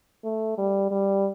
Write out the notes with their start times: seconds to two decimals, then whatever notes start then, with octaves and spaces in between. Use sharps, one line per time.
0.24 A3
0.58 G3
0.91 G3